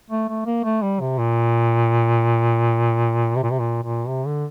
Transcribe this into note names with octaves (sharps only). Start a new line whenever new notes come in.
A3
A3
A#3
A3
G3
C3
A#2
C3
A#2
C3
A#2
A#2
C3
D3